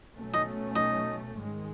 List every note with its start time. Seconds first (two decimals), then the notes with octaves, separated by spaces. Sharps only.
0.14 B2 F#3 A3 C#4
0.34 D#4
0.76 D#4
1.37 G#2 D#3 G#3